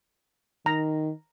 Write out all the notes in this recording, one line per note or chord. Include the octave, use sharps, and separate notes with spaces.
D#3 A#5